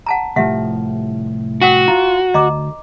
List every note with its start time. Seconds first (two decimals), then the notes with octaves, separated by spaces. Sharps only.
0.06 F#5 A5 A#5
0.36 C2 A2 F3 G4 E5 F#5
1.62 F#4 A#4 F#5 G5
1.88 F4 A#5
2.34 D2 D#5 A#5 D6